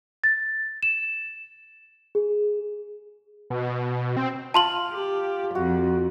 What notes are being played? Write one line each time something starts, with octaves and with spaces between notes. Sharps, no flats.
A6
E7
G#4
B2
C4
F4 F5 A5 C6 F#7
G4
F2 F#4